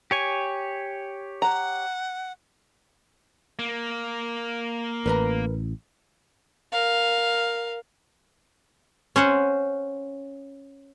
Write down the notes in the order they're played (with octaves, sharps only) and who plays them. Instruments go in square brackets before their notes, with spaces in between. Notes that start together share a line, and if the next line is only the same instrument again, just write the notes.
[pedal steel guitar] G4 C#5 G#5
[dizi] F#5 [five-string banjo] A#5
[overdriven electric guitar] A#3
[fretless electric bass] A1 [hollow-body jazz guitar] A#4 B4 A#5
[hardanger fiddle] A#4 F5
[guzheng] C#4 C5 F#5